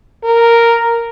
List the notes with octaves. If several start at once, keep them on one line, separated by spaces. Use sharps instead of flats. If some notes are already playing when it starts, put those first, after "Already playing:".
A#4